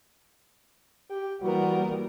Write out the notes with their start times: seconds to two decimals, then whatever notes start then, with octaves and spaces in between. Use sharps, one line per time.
1.11 G4 G5
1.42 E3 G3 A#3 B3 F#4 A#4